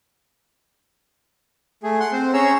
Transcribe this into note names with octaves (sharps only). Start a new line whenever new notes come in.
A3 G#4
F#5 C6
C4 C5
C#4 G#4 C#5 A#5 E6